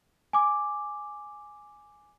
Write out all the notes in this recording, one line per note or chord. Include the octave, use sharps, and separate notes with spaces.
G#5 D6